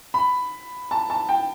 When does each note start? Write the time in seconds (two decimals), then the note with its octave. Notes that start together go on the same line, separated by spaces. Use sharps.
0.14 B5
0.91 A5
1.10 A5
1.29 G5